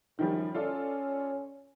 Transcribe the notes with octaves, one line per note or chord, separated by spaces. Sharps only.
F#2 D#3 F3 G3
C#4 F4 A4 D5